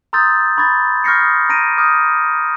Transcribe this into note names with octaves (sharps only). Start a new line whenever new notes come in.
A#5 C6 D#6 E6 G6 A6
B5 C#6 G#6 A6
C#6 F6 G6 A#6 C7 C#7
D#6
A#5 A#6 D7 D#7
D6 D#6 F6 G6